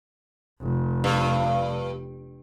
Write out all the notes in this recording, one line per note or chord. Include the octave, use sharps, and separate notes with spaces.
F1
G2